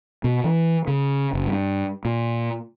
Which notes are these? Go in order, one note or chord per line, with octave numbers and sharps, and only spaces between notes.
B2
E3
C#3
F#1
G2
A#2